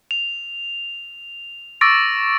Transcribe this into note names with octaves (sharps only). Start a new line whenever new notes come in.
F7
C#6 D6 E6 A6 A#6 D7